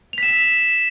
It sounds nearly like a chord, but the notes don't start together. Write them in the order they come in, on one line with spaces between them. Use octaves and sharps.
F7 B6 E7